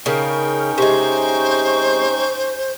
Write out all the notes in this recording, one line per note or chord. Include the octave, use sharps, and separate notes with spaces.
C#3 C#4 D#4 A#4 G5
C3 G#3 C5 C#6